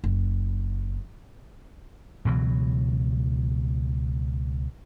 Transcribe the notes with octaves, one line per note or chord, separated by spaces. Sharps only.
F#1
C#2 B2 E3 F#3